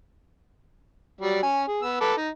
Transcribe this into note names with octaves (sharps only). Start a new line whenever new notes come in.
F#3 G3 D5
C#4 G#5
G#4
B3 E6
A4 B4 D6
D#4